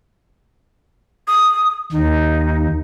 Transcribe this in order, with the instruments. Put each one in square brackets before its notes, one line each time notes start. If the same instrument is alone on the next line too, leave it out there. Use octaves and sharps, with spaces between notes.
[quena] D#6
[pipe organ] D#2 [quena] D#4